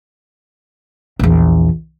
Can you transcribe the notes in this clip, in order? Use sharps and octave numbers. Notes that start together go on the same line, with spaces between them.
A#1 E2